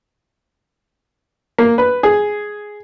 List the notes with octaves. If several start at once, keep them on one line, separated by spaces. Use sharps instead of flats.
A#3
B4
G#4